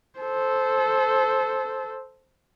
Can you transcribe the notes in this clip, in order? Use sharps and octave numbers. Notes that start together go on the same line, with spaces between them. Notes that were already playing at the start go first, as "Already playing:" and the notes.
A4 C5